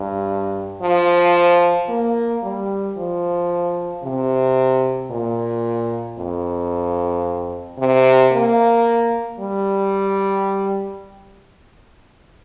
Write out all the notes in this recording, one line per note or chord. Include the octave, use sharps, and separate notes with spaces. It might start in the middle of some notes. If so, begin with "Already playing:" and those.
Already playing: G2
F3
A#3
G3
F3
C3
A#2
F2
C3
A#3
G3